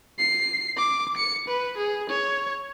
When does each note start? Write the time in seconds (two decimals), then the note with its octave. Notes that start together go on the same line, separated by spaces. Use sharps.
0.19 C7
0.77 D6
1.17 C#7
1.48 B4
1.77 G#4
2.10 C#5